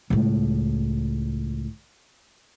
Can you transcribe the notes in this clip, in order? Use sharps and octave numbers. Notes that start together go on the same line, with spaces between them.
C#2 A2